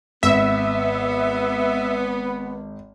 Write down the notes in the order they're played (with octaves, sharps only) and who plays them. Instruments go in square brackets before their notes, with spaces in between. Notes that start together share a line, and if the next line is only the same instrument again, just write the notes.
[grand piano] G#1 [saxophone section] B3 [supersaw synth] E5